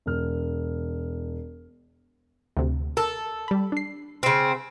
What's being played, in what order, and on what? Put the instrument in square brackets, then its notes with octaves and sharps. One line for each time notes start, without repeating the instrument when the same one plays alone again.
[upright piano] E1 F6
[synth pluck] D2 C3
[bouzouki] A4 [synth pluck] A#4
[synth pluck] G3 B5
D4 C7
[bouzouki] C#3 C4